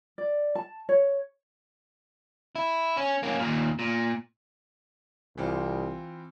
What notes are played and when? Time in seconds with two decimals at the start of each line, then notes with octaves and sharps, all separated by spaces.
0.18 D5
0.55 A5
0.89 C#5
2.56 E4
2.97 C#4
3.23 A#3 C#4
3.40 D#2 A#2
3.79 A#2
5.38 C2 E3 C4 F4